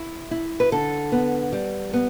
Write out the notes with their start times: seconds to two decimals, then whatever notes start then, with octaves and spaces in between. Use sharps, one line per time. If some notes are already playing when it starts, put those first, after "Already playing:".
Already playing: E4
0.31 E4
0.60 B4
0.72 D3 A4
1.12 B3
1.52 G3
1.93 B3